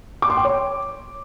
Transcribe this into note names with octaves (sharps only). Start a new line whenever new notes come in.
D6
C6
G5
C#5